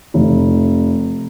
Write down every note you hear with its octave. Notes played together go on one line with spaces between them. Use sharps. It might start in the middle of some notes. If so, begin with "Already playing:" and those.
F1